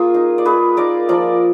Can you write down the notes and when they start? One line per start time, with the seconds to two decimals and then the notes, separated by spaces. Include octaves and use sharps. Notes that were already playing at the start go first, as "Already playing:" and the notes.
Already playing: A#3 F4 G#4
0.14 D#4
0.38 D5
0.45 A#3 G#4 B4
0.77 D#4 A#4 D5
1.09 F3 A#4 D5